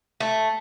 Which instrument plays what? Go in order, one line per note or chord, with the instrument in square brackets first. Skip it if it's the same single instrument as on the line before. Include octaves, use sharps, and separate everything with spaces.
[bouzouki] A3